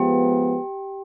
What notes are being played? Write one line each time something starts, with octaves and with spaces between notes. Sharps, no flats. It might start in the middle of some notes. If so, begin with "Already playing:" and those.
Already playing: F3 G#3 B3 G4